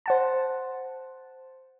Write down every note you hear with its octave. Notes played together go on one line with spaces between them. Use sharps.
C5 F#5 A5